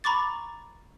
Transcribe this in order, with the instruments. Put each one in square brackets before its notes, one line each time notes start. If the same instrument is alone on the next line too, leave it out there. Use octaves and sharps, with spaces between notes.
[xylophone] A#5 B5 C#6 D6 A6